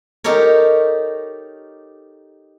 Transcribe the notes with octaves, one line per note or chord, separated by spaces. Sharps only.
D#4 G4 A4 A#4 C#5